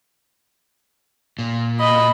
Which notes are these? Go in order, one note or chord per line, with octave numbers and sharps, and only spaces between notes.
A#2
D#5 B5